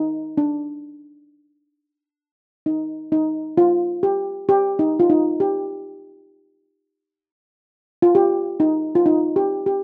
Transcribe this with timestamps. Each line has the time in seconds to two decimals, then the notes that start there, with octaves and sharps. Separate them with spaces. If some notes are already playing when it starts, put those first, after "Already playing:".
Already playing: D#4
0.37 D4
2.66 D#4
3.12 D#4
3.57 F4
4.03 G4
4.49 G4
4.79 D#4
5.00 F4
5.10 D#4
5.40 G4
8.02 F4
8.15 G4
8.60 D#4
8.95 F4
9.06 D#4
9.36 G4
9.66 G4